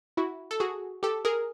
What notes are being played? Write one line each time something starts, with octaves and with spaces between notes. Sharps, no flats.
E4 F#4
A4
F#4 G#4
G4 A4
G#4 A#4